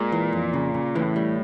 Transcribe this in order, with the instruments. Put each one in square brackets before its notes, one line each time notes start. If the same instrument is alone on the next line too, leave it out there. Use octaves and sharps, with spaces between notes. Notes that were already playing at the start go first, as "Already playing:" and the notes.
Already playing: [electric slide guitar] A#2 [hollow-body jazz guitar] G#3
[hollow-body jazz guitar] E3
F2
C#3
C#3
[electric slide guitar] A2 [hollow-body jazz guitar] E3
[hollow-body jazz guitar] G3